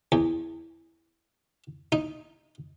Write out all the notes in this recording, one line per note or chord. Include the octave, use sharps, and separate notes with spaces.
E2
D#4